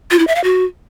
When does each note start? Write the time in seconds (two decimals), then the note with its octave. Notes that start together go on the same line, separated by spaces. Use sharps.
0.11 F4
0.19 E4
0.27 E5
0.36 F5
0.44 F#4